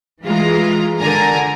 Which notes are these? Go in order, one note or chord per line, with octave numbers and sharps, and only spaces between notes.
E3 G#3 F4 A#5
D3 A#4 G#5 A#5